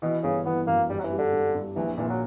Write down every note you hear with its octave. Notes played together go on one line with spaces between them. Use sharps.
B2 E3
G1 C#3
E3 B3
F#2 A#3
G2 G3
F#3
E3
G3
D3
G2
G2
A#1 E3
A#2 E3
F#3